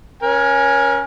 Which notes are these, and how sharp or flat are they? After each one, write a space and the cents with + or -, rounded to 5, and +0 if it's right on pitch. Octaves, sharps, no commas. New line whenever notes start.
C#4 +0 A#4 +35 G#5 +0